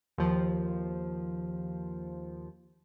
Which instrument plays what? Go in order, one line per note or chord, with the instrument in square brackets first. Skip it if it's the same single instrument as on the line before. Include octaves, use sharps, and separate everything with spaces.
[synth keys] D#2 F3